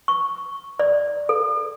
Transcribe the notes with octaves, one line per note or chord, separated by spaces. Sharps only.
C#6
D5
A4